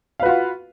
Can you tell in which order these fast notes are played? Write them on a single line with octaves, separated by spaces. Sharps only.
F5 B4 F#4 F4